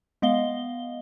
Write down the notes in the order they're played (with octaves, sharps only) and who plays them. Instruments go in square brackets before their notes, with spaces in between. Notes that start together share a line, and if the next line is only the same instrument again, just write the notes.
[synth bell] G#3 B3 D#5 F5 G7